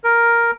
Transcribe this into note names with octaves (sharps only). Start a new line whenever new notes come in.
A#4